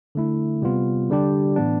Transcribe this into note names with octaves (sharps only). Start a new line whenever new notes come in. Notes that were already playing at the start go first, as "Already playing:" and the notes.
D3 A3 E4
C3 G3 B3 F4
D3 G3 D4 G4
A2 E3 B3 D4